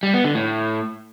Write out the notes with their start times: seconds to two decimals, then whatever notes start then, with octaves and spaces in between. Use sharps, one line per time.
0.03 G3
0.14 B3
0.24 D3
0.35 A2